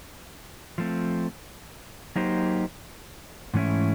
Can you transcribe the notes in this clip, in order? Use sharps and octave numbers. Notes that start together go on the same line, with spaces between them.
F3 A3 C4
F#3 A#3 D#4 G4 C5
G#2 E3 A3 C#4 E4